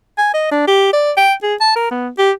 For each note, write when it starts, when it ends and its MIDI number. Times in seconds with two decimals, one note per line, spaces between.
0.18 0.32 80
0.34 0.49 75
0.51 0.66 62
0.67 0.89 67
0.93 1.12 74
1.17 1.34 79
1.43 1.55 68
1.60 1.75 81
1.76 1.88 70
1.91 2.09 59
2.18 2.32 67